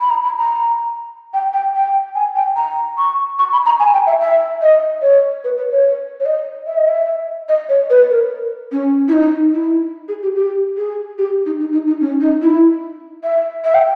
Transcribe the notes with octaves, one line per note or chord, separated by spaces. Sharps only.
B5
A#5
B5
A#5
G5
G5
G5
G#5
G5
A#5
C#6
C#6
B5
A#5
G#5
G5
E5
E5
D#5
C#5
B4
B4
C#5
C#5
D#5
E5
D#5
E5
D#5
C#5
B4
A#4
C#4
E4
D#4
E4
G#4
G4
G4
G#4
G4
D#4
D#4
D#4
D#4
C#4
D#4
E4
E5
E5
G5